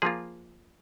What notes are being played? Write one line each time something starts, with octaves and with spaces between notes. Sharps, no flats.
F3 A#3 F4 G#4